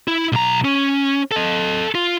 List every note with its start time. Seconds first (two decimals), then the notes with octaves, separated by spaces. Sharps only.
0.08 E4
0.32 B1 A#5
0.65 C#4
1.32 A4 D#5
1.95 F4